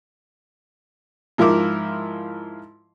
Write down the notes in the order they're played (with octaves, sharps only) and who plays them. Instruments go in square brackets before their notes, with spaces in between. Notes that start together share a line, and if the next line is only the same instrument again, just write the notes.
[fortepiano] G#2 F3 E4 F4 A#4 D6